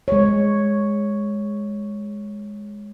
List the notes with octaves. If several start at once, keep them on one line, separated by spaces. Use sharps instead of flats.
G#3 C#5